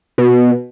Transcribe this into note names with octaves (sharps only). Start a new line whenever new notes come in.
B2